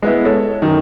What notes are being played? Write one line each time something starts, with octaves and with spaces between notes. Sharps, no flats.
G#3 B3 E4
A4 C#5
F#2 D#3